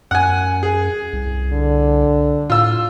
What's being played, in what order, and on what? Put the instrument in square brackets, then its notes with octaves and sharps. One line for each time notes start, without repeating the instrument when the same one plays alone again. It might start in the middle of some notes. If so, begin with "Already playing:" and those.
[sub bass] F#2 [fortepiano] F#5 G#5
[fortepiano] G#4
[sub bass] C2
[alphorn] D3
[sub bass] A2 [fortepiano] F4 E6